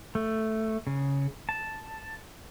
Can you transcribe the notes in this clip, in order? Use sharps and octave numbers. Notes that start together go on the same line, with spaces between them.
A3
C#3
A5